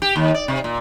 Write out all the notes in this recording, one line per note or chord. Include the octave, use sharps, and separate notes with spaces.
G4
D#2
D5
C3
A#2